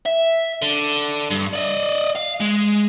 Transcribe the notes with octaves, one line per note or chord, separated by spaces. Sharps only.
E5
D3
G2
D5 D#5
F5
G#3